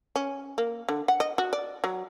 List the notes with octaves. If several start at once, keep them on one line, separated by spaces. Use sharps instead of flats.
C#4
A#3
D3
F#5
D#5
F#4
D5
F#3